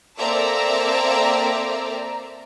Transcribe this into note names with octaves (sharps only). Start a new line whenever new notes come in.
A#3 C4 A4 D5 E5 A#5